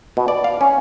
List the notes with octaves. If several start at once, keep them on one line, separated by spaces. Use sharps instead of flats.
B2
D5
F5
C#4